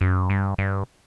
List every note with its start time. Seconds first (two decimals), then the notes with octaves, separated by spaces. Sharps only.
0.01 F#2
0.30 G2
0.58 G2